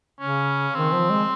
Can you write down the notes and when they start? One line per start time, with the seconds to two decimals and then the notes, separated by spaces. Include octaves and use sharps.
0.20 C#3 C#4
0.74 D#3 C4
0.92 F3
1.10 G#3